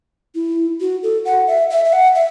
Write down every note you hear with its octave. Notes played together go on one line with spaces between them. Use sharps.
E4
F#4
A4
F#5
E5
E5
E5
F#5
E5